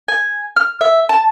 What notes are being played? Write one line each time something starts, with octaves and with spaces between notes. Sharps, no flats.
G#5
F6
E5
A5